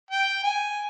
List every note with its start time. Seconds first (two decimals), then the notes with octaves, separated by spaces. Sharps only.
0.10 G5
0.43 G#5